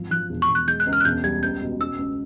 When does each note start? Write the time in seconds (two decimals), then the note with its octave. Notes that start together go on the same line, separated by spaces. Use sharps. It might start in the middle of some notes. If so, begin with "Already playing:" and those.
Already playing: G#1 F3
0.11 F3 F#6
0.30 E1
0.42 C#6
0.49 E1
0.55 F#6
0.68 G#3 G6
0.80 F#6
0.87 C#2
0.93 F6
1.01 F#6
1.05 E1 G6
1.24 G3 G#6
1.43 C#2 G6
1.61 B2
1.81 C#4 E6
1.99 C#2